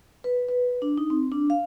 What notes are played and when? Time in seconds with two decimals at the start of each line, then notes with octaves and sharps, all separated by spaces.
0.24 B4
0.48 B4
0.82 D4
0.98 D#4
1.10 C4
1.32 D4
1.50 F5